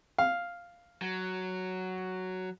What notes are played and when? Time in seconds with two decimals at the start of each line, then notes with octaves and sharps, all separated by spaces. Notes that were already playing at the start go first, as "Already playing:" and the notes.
0.18 F5
1.02 F#3